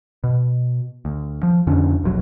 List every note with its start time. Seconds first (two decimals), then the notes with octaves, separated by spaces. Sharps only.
0.24 B2
1.05 D2
1.43 F3
1.67 F2 D3 C#4 D4
2.03 E1 A#1 G#2 F#3